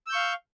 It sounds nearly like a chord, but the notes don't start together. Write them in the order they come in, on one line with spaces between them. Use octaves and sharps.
E6 G6 C#6 F5